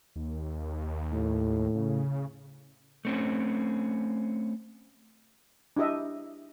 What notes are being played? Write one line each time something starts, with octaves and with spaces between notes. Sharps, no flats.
D#2
A2
C#3
A3 C4 C#4
D4 E4 G4 D#5 E5